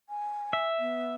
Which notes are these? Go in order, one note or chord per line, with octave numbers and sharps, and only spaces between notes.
G#5
E5
B3